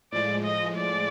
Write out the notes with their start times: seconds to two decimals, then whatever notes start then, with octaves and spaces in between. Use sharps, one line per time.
0.12 A2 F3 G#3 D5
0.44 D#5
0.77 D5